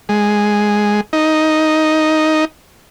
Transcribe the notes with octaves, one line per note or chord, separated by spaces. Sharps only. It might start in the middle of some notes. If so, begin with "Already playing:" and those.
G#3
D#4